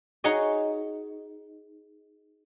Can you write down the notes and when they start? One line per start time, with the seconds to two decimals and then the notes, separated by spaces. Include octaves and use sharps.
0.24 D#4 F#4 G#4 C#5 D#5